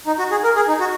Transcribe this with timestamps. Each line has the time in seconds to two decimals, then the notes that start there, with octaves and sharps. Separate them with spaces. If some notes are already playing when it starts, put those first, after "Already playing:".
0.07 D#4
0.19 F#4
0.31 G#4
0.44 A#4
0.56 G#4
0.68 D#4
0.80 F#4